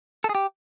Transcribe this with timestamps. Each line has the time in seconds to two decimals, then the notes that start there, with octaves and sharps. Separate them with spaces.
0.24 A4
0.29 G#4
0.35 G4